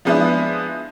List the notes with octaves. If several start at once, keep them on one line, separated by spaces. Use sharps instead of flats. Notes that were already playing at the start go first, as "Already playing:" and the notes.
F3 G#3 B3 D4 E4